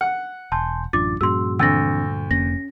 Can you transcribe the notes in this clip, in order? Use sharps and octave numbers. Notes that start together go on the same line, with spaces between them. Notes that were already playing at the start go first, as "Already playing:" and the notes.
F#5
E1 G#5 A5 C6 G6
A1 F#2 D4 F4 D6 A6
G2 A#2 F3 C#4 F#4 G#4 C6 E6
D2 E3 C4 D4 E6 A6 A#6
F1 F2 A#3 C#4 A#6